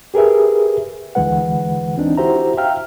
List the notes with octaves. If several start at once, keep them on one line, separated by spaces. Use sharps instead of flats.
G4 G#4 A#4 B4 E5
D2 D3 E3 G#3 B4 F#5
E3 C4 D4 D#4
E4 F#4 G4 C5 E5 A#5
E5 F5 G5 A#5 F6